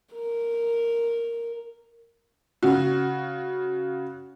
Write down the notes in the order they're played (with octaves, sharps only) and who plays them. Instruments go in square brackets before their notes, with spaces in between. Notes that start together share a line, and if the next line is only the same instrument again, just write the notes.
[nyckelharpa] A#4
[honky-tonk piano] C#3 F#4